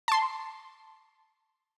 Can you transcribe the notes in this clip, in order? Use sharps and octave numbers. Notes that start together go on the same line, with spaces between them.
A5 C6